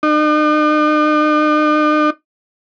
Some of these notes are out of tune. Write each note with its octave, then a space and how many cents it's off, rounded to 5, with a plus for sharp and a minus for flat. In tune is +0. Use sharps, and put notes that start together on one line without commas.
D#4 -45